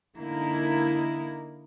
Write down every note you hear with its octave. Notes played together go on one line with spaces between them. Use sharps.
D3 A#3 D#4 E4